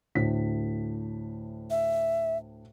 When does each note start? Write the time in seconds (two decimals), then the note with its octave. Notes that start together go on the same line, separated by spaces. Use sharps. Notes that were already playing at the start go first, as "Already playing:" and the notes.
0.15 D2 A2 B6
1.70 E5